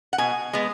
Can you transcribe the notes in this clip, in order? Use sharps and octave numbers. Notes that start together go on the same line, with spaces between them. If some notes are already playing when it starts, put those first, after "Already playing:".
F#5
B2 G#5
G#3 B3